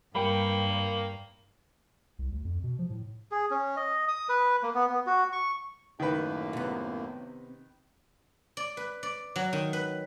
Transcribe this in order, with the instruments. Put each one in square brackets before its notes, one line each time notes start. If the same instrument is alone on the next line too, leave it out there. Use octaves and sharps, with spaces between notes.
[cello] G2 [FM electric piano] G3 A#4 C#7 [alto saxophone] A#3 [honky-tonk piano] G5 B5
[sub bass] C2
D2
F2
B2
F3
A2
[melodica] G#4
C#4
D#5
D#6
B4
A#3
B3
B3
F#4
C#6
[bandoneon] F#2 A2 A#3 [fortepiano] D#3 B4
[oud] C3 B3
[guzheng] D5
B4
D5
F#3
D#3
B4